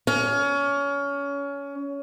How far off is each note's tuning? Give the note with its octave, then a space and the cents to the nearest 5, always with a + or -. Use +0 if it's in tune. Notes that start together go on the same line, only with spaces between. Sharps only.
C#4 +25